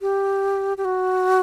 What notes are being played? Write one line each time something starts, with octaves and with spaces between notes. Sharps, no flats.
G4
G4
F#4